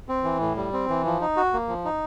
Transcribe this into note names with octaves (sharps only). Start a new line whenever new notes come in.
C4
E3
A2
G3
C4
E3
F3
D#4
F#4
A#3
F3
D#4